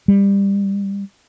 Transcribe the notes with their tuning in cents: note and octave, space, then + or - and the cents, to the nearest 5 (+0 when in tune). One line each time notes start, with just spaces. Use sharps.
G3 +20